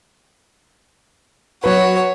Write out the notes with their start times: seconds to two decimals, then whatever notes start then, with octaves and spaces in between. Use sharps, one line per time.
1.64 F#3 F#4 B4 C#5